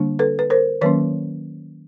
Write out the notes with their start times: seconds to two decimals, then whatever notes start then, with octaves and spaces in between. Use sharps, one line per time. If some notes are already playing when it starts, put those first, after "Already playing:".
Already playing: D3 G3 A#3 D4
0.19 A4 B4
0.39 B4
0.50 A#4 C5
0.81 D#3 F#3 A#3 C#4 B4 C#5